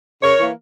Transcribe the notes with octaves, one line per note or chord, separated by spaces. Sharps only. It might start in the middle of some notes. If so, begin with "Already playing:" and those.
C#3 A#4 C#5
E3 A#3